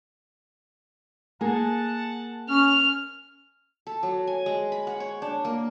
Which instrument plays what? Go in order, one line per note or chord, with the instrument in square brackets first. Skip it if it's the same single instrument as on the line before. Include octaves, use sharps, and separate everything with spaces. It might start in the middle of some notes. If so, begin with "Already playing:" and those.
[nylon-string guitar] A#3 G#4 [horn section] F#5 A5
[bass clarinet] C#4 [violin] F6
[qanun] A4
F#3
G#5
G#3
B5
F#5
C#5
D4
A#3